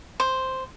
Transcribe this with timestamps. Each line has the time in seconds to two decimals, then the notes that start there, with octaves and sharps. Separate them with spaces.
0.20 C5